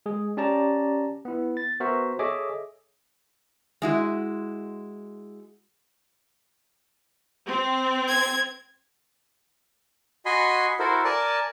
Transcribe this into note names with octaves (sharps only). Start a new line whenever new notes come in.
G#3 G#4
C#4 G4 D5 A5 A#5
B3 E4
A6
B3 F#4 A#4 C5 E5
G#4 A4 C#5 D#5 E5 D6
G#3 E4 F#4
C4
G#6
F#4 D#5 G#5 B5 C6
E4 F#4 A4 A#4 C5
A#4 D5 G#5 A5